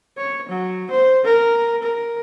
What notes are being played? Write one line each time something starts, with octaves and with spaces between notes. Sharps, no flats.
C#5
F#3
C5
A#4
A#4